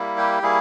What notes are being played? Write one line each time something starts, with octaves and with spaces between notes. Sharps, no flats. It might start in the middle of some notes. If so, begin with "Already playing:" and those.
Already playing: G3 A#3 E4
G4
G3 A#3 E4 G#4